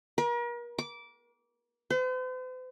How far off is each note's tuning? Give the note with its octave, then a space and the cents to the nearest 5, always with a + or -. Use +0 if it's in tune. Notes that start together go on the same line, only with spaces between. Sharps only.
A#4 +40
D6 -15
C5 -45